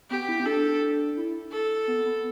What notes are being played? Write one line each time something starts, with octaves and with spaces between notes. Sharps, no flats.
B3 G4
E4
B3
D4 A4
E4
A4
B3
B3